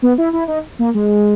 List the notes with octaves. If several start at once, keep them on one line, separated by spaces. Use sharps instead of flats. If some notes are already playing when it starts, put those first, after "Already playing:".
B3
E4
E4
D#4
A#3
G#3